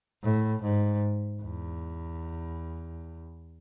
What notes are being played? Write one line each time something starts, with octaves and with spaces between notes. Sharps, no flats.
A2
G#2
E2